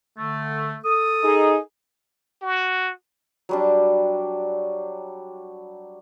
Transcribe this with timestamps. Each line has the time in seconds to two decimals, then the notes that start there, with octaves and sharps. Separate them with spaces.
0.17 D3 A3
0.84 A4 D#6
1.23 D#4 G#4
2.42 F#4
3.49 F#3 G3 D4